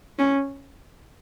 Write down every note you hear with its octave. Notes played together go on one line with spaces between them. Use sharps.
C#4